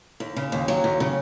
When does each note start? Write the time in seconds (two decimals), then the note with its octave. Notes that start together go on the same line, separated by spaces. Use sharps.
0.20 D#2
0.36 C#3
0.52 D#2
0.68 F#3
0.84 D#2
1.00 C#3